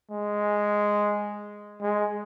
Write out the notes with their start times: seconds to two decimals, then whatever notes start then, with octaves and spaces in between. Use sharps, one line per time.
0.11 G#3
1.81 G#3